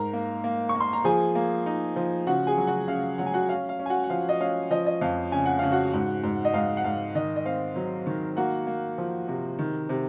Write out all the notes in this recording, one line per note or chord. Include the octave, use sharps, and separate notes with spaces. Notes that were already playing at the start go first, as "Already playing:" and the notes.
Already playing: G#2 A#4 A#5
A#3
A#3
C#6
A#3
C6
A#5
F3 G#4 G#5
A#3
D#4
F3
C#3 F#4 F#5
G#4 G#5
F#3
F#4 F#5
C#3 F5
F#3 F#5
G#5
F#4 F#5
C#4 F5
F5
C#4
G#5
F#4 F#5
F#5
F3 F5
D#5
C#4 F5
F3 D#5
D#5
F2 F5
C#3 G#5
F#5
C#3 F5
F#4 F#5
G#2
G#2
D#5
G#2 F5
F#5
G#2 F5
D#3 D#5
D#5
C4 F5
F#3
D#3
A#3 F#4 F#5
A#3
F3
C3
D#3
C3